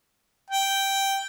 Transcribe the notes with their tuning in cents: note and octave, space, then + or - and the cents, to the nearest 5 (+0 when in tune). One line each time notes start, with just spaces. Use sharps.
G5 -5